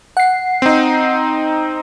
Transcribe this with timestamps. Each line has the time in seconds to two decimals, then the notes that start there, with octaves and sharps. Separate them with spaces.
0.17 F#5 C7
0.62 C4 D#4